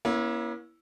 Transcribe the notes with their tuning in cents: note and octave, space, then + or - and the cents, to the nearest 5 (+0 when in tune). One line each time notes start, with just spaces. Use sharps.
A#3 +45 C#4 +0 E4 +0